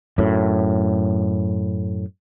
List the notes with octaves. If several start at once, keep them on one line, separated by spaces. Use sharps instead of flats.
F#2 A2